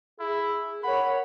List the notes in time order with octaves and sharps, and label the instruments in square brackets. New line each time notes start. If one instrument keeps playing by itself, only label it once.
[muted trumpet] E4 [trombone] G#4
[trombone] A#4 [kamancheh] C#5 F#5 [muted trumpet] B5